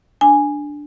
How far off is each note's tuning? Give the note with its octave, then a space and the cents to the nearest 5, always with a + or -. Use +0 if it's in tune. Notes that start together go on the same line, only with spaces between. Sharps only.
D4 +0 G#5 -5